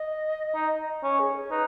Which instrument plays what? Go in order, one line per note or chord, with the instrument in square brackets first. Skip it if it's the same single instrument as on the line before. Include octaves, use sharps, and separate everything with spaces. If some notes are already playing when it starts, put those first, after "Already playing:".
Already playing: [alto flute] D#5
[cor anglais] D#4
[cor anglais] C#4 [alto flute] C#5
[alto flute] G#4
C#5
[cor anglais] D#4 [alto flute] B4